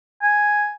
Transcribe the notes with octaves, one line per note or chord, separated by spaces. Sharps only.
G#5